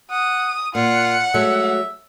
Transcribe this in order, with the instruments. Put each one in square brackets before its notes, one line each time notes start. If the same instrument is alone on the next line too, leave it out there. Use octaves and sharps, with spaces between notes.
[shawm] F#5 [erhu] D#6
[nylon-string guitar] A#2 [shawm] F4 [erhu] F#5
[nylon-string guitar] F#3 G#3 A3 [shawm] E5